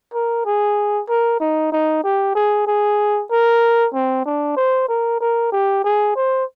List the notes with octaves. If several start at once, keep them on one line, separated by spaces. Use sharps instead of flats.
A#4
G#4
A#4
D#4
D#4
G4
G#4
G#4
A#4
C4
D4
C5
A#4
A#4
G4
G#4
C5